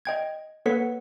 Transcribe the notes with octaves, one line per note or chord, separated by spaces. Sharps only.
D#5 G5 G#6
A#3 A4 B4 C#5 F#5 B6